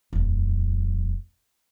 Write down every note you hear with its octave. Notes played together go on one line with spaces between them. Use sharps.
D#1 F2